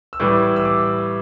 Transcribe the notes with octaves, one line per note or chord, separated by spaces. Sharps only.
E6
A2 E3 G3 D6
E6
D6